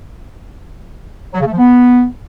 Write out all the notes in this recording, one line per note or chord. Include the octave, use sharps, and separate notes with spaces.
F#3
C#3
A3
F3
B3